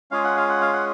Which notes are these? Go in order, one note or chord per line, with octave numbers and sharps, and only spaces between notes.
G#3 C#4 F4 G#4 F5
F#5
F5
F#5
F5
F#5